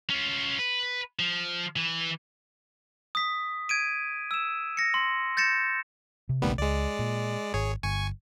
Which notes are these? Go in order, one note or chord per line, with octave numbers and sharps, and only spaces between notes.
C#4 F4
B4
F3
E3
D#6 B6
G#6 D7 D#7
E6 E7
A#6 C#7
C6
G6 A6 A#6 C#7 E7
C3
A#1 D#2 C3 G3 A3 B3
C#2 G#3 D5
A#2
G#1 G#4 C#5
G1 G#5 C#6